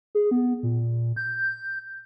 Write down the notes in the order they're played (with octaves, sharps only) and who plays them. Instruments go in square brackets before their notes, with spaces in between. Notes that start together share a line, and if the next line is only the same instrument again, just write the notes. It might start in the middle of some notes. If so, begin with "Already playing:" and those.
[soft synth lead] G#4
B3
A#2
G6